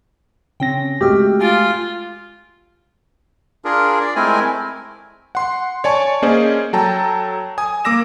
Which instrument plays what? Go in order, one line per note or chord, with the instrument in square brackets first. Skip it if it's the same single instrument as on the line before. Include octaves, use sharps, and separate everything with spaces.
[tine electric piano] C#3 C#4 A#6 [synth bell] C4 G5
[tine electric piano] G#3 A3 [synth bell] F#4 E6 F6 [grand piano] G4
[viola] F4 [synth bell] G#5 A6 D7
[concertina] D4 F4 G#4 A#4
D5
G#3 A3 C4 E4 A#4 G#5
[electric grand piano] F#5 C6
C#5 D5 G#5 A5 C#6
A#3 C#4 G#4 C5 D5 D#5
F#3 A4 G5 A5 A#5
G#5 D#6
A#3 D6 E6 A#6 E7